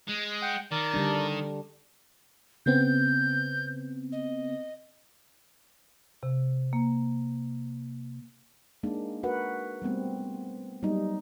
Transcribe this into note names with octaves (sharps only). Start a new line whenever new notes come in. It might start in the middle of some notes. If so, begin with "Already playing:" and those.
G#3
F#5 G5
D#3 A#4 D5
D3 G3 D4
C#3 B3 C4 G6
D#5
C3
A#3
G#3 A#3 D4 D#4
F#4 A#4 B4 F#5
G3 A3 B3 C4
F#3 G3 A#3 B3 D#4